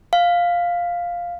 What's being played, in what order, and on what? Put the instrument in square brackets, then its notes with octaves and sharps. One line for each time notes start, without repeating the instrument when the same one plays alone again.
[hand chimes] F5